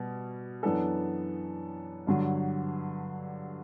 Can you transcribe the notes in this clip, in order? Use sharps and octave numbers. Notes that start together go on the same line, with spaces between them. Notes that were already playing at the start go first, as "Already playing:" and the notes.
Already playing: B2 G3 B3
F#2 E3 B3 D4 A4
G2 D3 F#3